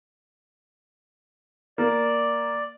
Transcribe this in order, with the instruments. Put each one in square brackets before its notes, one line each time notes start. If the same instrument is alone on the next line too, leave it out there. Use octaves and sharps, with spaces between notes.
[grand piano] A#3 [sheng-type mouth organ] D5